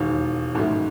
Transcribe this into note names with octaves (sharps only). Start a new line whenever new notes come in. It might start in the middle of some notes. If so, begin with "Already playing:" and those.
Already playing: E1 D#2 D#3
A1 G#2 D#3 F#3 A3